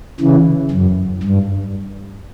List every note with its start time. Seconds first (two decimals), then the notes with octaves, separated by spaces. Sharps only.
0.20 C#3 E3
0.71 F#2
1.23 G2